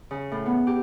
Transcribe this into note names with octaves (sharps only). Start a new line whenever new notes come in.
C#3
A2
B3
G4